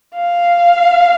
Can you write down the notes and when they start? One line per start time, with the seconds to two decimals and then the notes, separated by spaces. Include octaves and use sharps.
0.15 F5